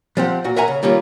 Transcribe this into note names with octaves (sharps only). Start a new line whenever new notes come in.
F3 C4 G4 F#5
A#2 F#4
A#4 E5 F#5 G#5 A#5
C#3
D#3 G3 A#3 C#4 F4